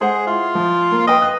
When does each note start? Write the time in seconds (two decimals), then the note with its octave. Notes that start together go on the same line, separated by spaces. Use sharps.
0.01 G#3 G#4 C5 F#5
0.27 E4 F4
0.55 F3
0.91 A#3
1.07 B4 D#5 G5
1.22 D#6 F#6